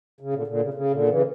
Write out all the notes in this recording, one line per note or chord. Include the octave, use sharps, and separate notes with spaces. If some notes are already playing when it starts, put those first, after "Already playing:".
C#3
A#2 D3
A#2 D3
C#3
C#3
A#2 D3
C#3 E3